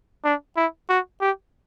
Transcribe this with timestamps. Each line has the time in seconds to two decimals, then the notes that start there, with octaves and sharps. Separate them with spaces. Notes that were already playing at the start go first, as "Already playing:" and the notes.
0.24 D4
0.56 E4
0.89 F#4
1.21 G4